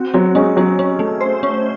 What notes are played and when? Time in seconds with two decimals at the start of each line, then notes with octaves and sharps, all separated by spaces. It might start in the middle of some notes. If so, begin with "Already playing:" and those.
Already playing: C4 F#4
0.14 F#3 C4
0.35 G#3 C#4
0.57 F#3 C#4
0.79 C#4
0.99 A3
1.21 C5
1.43 C#4